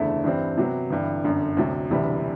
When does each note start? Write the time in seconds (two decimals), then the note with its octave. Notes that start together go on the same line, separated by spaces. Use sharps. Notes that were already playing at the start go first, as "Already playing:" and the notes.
Already playing: F#1 E2 D3 A3 E4
0.24 G2 E3 G3 C4
0.57 C3 F#3 B3
0.90 G1 G2 E3
1.24 G1 F#2 D3
1.57 D2 C3 F#3
1.90 E1 D2 C3 E3 G3